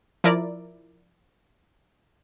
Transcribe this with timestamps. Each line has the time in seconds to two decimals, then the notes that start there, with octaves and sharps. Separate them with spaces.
0.24 F3 E4 A#4 D5